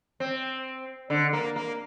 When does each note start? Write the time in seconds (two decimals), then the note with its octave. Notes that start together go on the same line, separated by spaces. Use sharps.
0.20 C4
1.10 D3
1.33 A#3
1.56 A#3